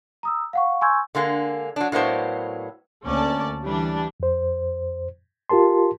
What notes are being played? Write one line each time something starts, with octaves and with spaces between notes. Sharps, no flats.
A#5 D#6 E6
F5 F#5 C#6
G#5 C6 C#6 E6 G6 G#6
D3 G#3 A#3 G#4
F#3 D4
A2 F#3 A#3 B3 C5 D5
D2 A#3 C#4 D5 A5
E3 G3 D4
F2 C5
F4 G4 A#4 A5 C6